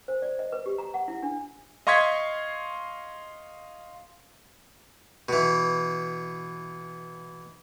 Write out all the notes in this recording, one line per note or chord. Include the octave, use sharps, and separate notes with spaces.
C5
D5
D#5
B4
G4
A#5
F#5
E4
D4
D#5 F5 C6 C#6 G#6 B6
B2 E3